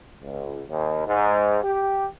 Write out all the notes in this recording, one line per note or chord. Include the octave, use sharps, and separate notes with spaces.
C#2
D#2
G#2
G4